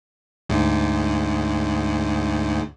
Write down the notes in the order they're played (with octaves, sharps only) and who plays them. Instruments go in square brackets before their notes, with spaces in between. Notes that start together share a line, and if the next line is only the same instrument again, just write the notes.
[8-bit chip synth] D2 G#2